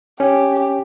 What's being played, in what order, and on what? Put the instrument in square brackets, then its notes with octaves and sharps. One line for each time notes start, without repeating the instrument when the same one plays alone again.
[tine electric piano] C#4 [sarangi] G4